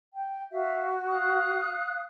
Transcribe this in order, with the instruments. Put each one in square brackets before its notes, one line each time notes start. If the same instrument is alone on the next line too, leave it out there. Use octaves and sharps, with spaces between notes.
[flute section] G5
[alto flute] F#4 [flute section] E5 F5
[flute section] F5 D#6 F#6